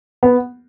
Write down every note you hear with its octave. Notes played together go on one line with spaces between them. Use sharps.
B3